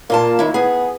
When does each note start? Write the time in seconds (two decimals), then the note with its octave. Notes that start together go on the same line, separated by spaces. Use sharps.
0.10 A#2 A#3 F4 A5
0.39 D#3 E4
0.54 B3 G#4